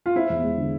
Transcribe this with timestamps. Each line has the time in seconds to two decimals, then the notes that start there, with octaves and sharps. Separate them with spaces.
0.06 F4
0.16 C4 E4
0.30 E2
0.44 G#3
0.58 D3